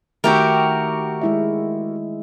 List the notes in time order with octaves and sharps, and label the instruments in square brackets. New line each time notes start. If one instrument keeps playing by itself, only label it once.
[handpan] D#3 A3 E5 [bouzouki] F#4 G4 A#4
[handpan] G#3 E4 E5